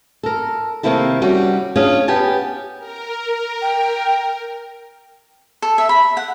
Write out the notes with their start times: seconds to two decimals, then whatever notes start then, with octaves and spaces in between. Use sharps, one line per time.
0.23 A4 A#4
0.83 C3 D#3 A#3 C4 E4 A4
1.22 G3 C#4 F#4
1.76 C#4 D4 F4 G#4
2.08 B3 G4 G#5 A5
2.77 A#4
3.62 G5
5.62 A4
5.78 E5
5.89 B5
6.17 F#5